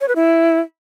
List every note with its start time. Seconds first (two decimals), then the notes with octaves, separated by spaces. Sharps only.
0.01 C#5
0.08 B4
0.16 E4